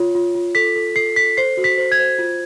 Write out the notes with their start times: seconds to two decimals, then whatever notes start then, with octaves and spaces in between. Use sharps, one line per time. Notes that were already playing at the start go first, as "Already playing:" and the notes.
Already playing: F4 C#5
0.15 F4
0.35 F4
0.55 A4 B6
0.76 A4
0.96 A4 C7
1.16 A4 B6
1.37 C5 C7
1.57 F#4
1.64 B6
1.78 C5
1.92 G#6
1.99 C5
2.18 F4